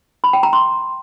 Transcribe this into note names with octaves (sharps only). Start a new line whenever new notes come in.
B5
G5
A#5
C6